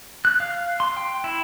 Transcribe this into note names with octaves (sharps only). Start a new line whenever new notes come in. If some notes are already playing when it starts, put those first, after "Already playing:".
F#6
F5
C6
G5
E4